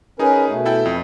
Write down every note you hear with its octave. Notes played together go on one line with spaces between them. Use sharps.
C#4 D#4 G#4 A#4 B4
B2 A3
E4 A4 G5
F2